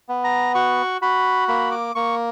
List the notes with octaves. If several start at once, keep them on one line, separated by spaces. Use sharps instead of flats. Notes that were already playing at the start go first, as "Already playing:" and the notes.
B3
A#5
F#4 C#6
F#4 B5
A#3 B5
D6
A#3 C#6